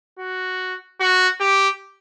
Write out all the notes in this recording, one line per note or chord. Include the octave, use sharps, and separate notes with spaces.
F#4
F#4
G4